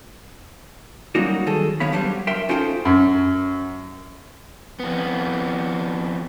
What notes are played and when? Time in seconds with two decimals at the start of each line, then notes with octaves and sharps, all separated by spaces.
1.15 F#3 G3 A#3 C#4 D#4 F#4
1.47 D#3 G#4 A4
1.80 D#3 B3 C#5 F5 B5
1.92 F#3 G3 D4 C5
2.27 A#4 E5 G5 C6
2.49 C#4 D#4 F4 A4 C5 G5
2.85 F#2
4.80 F2 B3